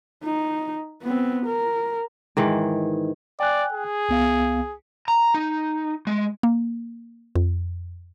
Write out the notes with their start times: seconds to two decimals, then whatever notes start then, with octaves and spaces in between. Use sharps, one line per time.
0.24 D#4
1.03 B3 C4
1.46 A#4
2.37 G#2 D#3 E3
3.40 D5 G5 G#5 F#6
3.72 G#4
4.09 C2 B3 F5
5.08 A#5
5.35 D#4
6.07 G#3
6.43 A#3
7.35 F2